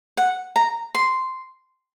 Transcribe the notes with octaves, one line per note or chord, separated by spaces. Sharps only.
F#5
A#5
C6